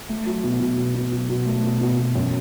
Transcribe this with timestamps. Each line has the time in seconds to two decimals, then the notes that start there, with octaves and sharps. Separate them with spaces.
0.09 A3
0.26 F#3
0.44 B2
0.60 B2
0.77 B2
0.95 B2
1.12 F#3
1.29 B2
1.46 A3
1.64 B2
1.81 B2
1.98 B2
2.15 F#2